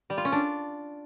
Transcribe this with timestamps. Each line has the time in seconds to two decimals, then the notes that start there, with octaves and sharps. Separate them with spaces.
0.10 G3
0.17 F4
0.25 C#4
0.32 D4